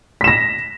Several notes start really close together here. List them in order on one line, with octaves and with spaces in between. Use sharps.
B6 E7 A#6